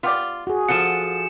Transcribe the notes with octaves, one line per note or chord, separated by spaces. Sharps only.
B3 F4 G4 D5
F#4 G#4
F3 A4 F#5 C#7 E7